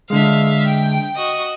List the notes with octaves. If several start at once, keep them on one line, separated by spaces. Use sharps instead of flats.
D3 G#3 E5 F5
G5
F#4 D#5